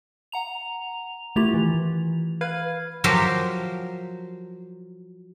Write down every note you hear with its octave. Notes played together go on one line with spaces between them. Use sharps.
F#5 A#5 F7
D#3 A3 E4 F4 G4 F7
E3
B4 F5 B5 F6 G#6
F3 F#3 G4 A#4 F5 A#5